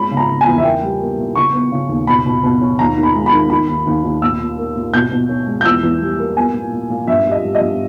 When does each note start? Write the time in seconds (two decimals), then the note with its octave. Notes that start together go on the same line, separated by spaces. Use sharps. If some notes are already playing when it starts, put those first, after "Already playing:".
Already playing: G#3 C#4 B5
0.11 C#3
0.17 A#5
0.28 C#3
0.41 G#5
0.47 E2
0.58 E5
0.64 A#3 G5
0.82 G3
1.01 A#3
1.18 A#2
1.35 C#3 C#6
1.53 B3
1.72 C#3
1.89 D#2
2.07 B2 B5
2.26 B2
2.43 B2
2.61 C#4
2.79 D#2 A#5
2.97 D#3
3.03 B5
3.15 G#3
3.26 B5
3.33 D#3
3.50 D#3 B5
3.68 D#2
3.87 D#2
4.04 D#2
4.22 A#2 E6
4.40 A#2
4.57 A#3
4.76 A#2
4.93 B2 G6
5.12 B2
5.29 C#4
5.47 G#3
5.61 G6
5.65 E2 E6
5.83 E2
6.01 G3
6.18 A#3
6.37 B3 G#5
6.54 A#2
6.72 A#2
6.90 A#2
7.07 G2 E5
7.26 G3
7.31 D#5
7.44 G3
7.55 D#5
7.61 G2